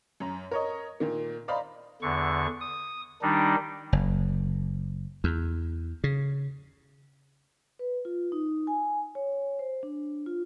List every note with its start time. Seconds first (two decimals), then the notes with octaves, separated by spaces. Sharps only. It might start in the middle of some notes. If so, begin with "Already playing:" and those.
0.20 F#2 A#5
0.51 A#4 C#5 D#5
1.00 A#2 D#3 A#3
1.48 C5 D5 D#5 F5 A#5 B5
2.02 E2 D3 C#6
2.60 D#6
3.22 D#3 G3 D4 D#4
3.93 F#1
5.24 E2
6.04 C#3
7.79 B4
8.05 F4
8.32 D#4
8.67 G#5
9.15 C#5
9.59 C5
9.83 D4
10.26 F4